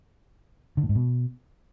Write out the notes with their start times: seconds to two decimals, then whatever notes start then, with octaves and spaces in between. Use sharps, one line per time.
0.77 D3
0.83 A2
0.89 G#2
0.95 B2